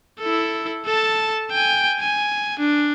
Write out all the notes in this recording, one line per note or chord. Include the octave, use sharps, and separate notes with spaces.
E4 A4
A4 A5
G5 G#5
G#5
D4